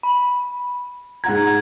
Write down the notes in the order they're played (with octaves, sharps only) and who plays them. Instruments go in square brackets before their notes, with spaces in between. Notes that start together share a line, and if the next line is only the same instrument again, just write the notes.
[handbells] B5
[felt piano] G#2 F#5 A#5 [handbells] G#6